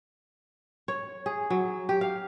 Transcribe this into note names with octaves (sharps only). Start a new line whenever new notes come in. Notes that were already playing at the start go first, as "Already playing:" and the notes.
C#5
G#4
F#3
G4
F5